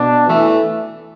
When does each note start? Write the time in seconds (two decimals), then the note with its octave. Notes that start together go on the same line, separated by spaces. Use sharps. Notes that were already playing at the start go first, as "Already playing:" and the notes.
Already playing: B2 D4
0.27 E3 A3